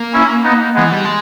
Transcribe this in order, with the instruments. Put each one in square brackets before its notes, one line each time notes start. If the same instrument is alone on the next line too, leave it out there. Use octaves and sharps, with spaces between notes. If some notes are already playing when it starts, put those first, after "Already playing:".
Already playing: [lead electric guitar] A#3
[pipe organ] C#4 E4
B3 D#4
[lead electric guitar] E3 [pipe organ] G#3 B3
[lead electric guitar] G3
G#3